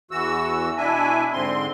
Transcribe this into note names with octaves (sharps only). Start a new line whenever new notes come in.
E2 E3 F#4 E6
B2 D4 E4 E5 G#5
G#2 D3 C4 C6